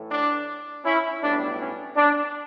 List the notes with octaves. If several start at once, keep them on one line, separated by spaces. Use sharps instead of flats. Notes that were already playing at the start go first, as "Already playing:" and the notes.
Already playing: A2 E3 A3
D4
C#4 E4
B1 A2 G3 B3 D4
C#4
D4